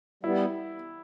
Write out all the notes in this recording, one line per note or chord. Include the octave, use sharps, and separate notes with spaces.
G3 B3 E4